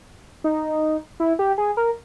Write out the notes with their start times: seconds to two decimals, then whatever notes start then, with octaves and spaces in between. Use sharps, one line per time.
0.44 D#4
1.20 E4
1.39 G4
1.58 G#4
1.77 A#4